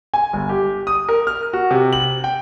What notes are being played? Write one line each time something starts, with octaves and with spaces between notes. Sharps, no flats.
G#5
G1
G4
D#6
A#4
F6
F#4
C3
F#7
G5